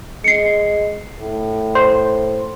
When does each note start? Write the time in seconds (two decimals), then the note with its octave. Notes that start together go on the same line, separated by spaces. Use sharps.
0.24 G#3 C7 C#7
1.20 A2
1.75 C5 C6